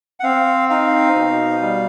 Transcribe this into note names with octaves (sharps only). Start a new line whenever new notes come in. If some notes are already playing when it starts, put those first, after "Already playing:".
F#5
C4 F5
D#4 F5
B2
G3